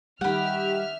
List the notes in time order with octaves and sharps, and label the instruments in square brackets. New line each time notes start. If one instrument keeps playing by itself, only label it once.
[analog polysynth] D#3 G4 [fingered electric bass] G3 [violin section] E5 F6 [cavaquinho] F#5 B5